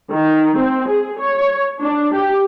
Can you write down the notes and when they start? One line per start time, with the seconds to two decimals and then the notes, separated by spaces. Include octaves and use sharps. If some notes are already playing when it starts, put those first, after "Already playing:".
0.12 D#3
0.58 C4
0.89 G#4
1.21 C#5
1.80 D4
2.14 G4